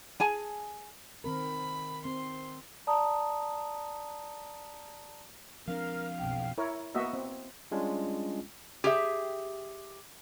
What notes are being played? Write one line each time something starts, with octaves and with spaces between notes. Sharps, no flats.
G#4 G#5 A5
D#3 C4 A#4 B5
C4 C6
D5 A5 A#5 D#6
F3 C4 D4 A#4 F5
B1 F2 G5
E4 A#4 C#5
A#3 B3 F#4 D#5 E5
C4
G3 G#3 C#4 D4 F4
G4 G#4 E5